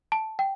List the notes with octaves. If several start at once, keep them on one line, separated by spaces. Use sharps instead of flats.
A5
G5